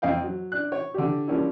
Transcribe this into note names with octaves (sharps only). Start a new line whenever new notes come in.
F2 D#5 F5 G5
F#3
D4 F#6
C#5
D3 D4 G4
F3 G3 A#3 C#4 D4 E4